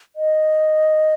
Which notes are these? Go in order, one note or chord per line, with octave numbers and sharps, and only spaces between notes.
D#5